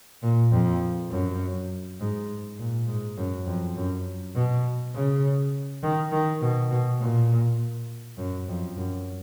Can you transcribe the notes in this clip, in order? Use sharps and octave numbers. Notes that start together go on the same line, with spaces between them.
A#2
F2
F#2
G#2
A#2
G#2
F#2
F2
F#2
B2
C#3
D#3
D#3
B2
B2
A#2
F#2
F2
F#2